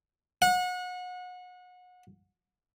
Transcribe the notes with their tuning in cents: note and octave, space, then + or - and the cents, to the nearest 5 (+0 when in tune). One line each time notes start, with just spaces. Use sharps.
F#5 -30